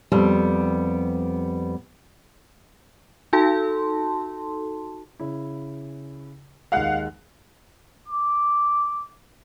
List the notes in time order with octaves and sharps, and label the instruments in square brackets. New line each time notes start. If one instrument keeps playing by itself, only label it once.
[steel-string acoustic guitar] F2 G3 B3
[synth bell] D#4 F#4 A4 A5 C6
[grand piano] C#3 E4
[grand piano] D#2 G#3 [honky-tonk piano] F5 F#5 F#6
[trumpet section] D6